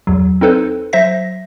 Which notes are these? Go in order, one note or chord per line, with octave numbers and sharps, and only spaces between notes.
E2 F#3
C4 D#4 A4 B4 C5
F#3 C5 E5 A#6